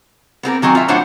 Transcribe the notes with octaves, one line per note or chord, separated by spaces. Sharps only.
B3 C4 G#4 A#4
D#3 F#3 C4 A#4 G#5
F4 E5
A2 D4 C5 C#5 F#5